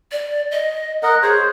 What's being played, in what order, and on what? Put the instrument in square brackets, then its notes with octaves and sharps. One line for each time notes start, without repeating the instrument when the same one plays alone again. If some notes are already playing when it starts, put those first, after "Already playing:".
[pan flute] D5
D#5
[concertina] A#4 D#5 F#5 [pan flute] F#6
[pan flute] G#4 [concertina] C5 C#5